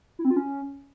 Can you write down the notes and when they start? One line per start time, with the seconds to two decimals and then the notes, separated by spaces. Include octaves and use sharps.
0.19 E4
0.25 C4
0.31 F4
0.36 C#4